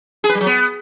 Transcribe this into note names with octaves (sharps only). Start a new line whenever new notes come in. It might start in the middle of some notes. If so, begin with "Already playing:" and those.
G#4
B4
G3
F#3
B3